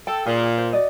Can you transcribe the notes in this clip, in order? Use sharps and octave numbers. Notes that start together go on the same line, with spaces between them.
A4 G5
A#2 G#4
C5
F#4 D5 D#5